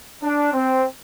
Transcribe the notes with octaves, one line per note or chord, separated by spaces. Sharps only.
D4
C4